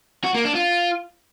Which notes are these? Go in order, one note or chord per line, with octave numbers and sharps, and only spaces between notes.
F#4
A#3
D4
F4